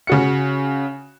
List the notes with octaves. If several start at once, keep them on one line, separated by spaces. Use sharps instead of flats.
C#3 F#4 C#7